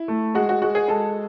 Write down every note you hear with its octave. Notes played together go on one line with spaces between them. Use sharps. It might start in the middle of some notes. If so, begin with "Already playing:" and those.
Already playing: E4
A3
G#3 F#4
F#4
G#3 F#4
G#4
G#3 A4